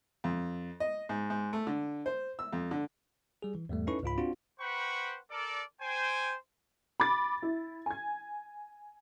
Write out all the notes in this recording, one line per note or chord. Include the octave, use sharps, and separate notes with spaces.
F2
D#5
G#2
G#2
A3
D3
C5
E6
F2
D3
G3 G#4
E3
E2 G#2 G3 A3
C#4 D#4 E4 A4 B4 C#6
C#2 G#2 F4 B5
C4 D4 F4 F#4
B4 C5 F#5 G5 B5 C#6
A4 A#4 D5
C5 G5 G#5
B5 D6 A6
E4
G#5 G#6